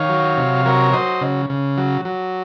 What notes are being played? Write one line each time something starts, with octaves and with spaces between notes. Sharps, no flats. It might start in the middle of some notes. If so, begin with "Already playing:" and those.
Already playing: D#3 C#5 F5
F#3
C3
F#3 A#4 C#5
F#3 C5 D#5
C#3
C#3
F#3
F#3